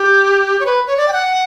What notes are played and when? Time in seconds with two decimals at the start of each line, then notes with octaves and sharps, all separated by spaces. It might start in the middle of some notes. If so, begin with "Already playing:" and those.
Already playing: G4
0.60 C#5
0.66 B4
0.87 C#5
0.97 D5
1.08 G5
1.13 F#5